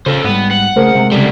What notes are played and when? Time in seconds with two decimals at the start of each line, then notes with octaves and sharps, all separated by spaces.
0.06 C#3 A4 C5
0.24 G#2 G3 B3
0.51 F#5
0.76 C#3 A3 G#4 A#4 C5
0.95 C3 G#3
1.11 C#3 G3 A4